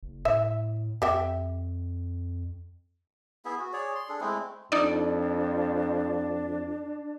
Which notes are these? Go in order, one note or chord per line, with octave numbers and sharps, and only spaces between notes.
F#1
A2 E5
F2 G4 E5 G5
B3 E4 G#4 E5
F#4
G#4 C#5 D5
C6
D4 G#4 A4
G#3 A3 C4 E4
F2 D4 D#4 D5